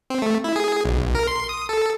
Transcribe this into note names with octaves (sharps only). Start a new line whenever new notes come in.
C4
A3
E4
G#4
B1
A#4
C6
D#6
A4